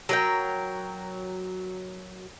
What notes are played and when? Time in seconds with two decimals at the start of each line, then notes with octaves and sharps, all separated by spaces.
0.09 F#3 A#4 G5